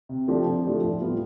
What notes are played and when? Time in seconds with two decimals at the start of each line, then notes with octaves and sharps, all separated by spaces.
0.09 C3
0.28 F3 A3 D4 G4
0.46 C3
0.65 F3 A3 D4 G4
0.83 A2
1.02 G3 B3 F4